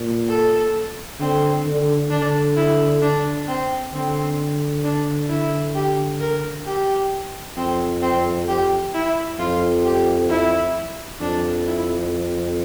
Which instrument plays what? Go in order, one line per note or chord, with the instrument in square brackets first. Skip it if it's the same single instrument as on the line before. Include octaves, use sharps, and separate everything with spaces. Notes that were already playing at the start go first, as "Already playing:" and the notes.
Already playing: [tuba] A#2
[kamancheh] A4
[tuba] D3 [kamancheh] C4
[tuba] D3
[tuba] D3 [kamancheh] D4
[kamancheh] E4
D4
C4
[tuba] D3 [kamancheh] C4
[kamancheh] D4
E4
G4
A#4
G4
[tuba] F2 [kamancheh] C4
[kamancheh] C4
G4
E4
[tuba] F2 [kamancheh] F4
[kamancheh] G4
E4
[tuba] F2 [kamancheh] D4
[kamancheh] E4